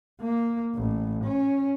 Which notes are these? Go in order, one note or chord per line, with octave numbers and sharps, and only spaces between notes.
A#3
A1
C#4